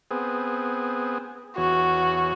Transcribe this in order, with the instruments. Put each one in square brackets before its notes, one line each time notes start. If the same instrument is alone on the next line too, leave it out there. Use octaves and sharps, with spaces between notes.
[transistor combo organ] B3 C4 G#4
[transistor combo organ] E2 C#5 [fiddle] F#4